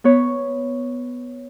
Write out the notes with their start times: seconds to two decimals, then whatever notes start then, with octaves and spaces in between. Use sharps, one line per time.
0.04 B3 B4 C#5